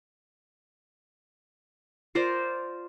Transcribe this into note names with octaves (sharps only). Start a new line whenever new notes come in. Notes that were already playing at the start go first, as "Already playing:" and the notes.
F4 A#4 C5 D5